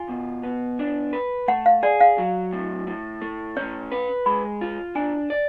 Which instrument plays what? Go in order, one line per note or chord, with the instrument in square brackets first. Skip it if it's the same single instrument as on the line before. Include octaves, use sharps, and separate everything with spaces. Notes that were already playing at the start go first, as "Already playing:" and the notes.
Already playing: [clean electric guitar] F4 [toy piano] G#5
[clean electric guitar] B2
B3
D4
B4
[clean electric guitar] A3 [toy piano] F#5
[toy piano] F5
[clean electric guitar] G#4 [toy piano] D5
[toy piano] F5
[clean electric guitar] F#3
A2
A2
A3
[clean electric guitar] C#4 [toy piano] C#5
[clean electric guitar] B4
[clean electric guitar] G#3 [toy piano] B5
[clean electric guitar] F4
[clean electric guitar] D4 [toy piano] G#5
[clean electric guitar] D5